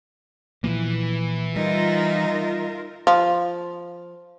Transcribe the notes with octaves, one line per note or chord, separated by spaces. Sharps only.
A#2 E3 F3 A#3
G3 D#4 F4 A#4 E5
F3